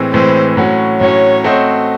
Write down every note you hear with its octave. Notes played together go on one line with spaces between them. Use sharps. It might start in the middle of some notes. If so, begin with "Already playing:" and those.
Already playing: A2 E3 G#3 C4
A2 E3 G#3 C4 C5
A2 F#3 C#4 F#4
A2 F#3 C#4 F#4 C#5
A3 C4 F#4 C5 D#5